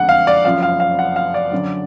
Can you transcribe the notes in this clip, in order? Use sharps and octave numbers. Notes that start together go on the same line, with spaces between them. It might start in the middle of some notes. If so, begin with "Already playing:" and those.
Already playing: F#1 F2 D3 F3 G#3 F#5
F5
D5
F#1 F#2 F3 F5
F5
F5
F#5
F5
D5
F#2 D3 F#3